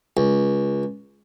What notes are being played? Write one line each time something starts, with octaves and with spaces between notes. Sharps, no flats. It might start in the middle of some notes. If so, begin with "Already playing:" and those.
C#2